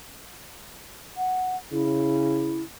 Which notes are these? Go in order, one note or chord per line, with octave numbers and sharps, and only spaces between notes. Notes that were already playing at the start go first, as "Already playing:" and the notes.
F#5
C#3 E4